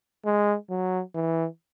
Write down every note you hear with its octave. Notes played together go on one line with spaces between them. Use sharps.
G#3
F#3
E3